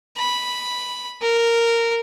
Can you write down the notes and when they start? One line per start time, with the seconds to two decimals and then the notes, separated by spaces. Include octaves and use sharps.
0.17 B5
1.22 A#4